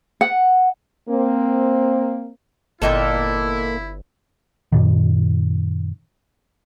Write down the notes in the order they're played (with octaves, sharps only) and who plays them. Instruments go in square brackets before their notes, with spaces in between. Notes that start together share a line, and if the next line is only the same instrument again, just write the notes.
[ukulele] F#5
[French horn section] A#3 C4
[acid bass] G1 [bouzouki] A#2 A#3 A4 [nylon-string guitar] B3 D#5 G5 [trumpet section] E4
[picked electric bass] F#2 A#2 D#3